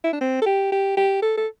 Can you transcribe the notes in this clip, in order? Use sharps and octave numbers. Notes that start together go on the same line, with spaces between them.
E4
D4
C4
A4
G4
G4
G4
A4
A4